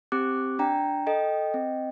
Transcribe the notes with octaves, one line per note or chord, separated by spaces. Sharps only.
C4 G4 D6 F#6
D4 G5 A#5
A4 D#5 G5
C4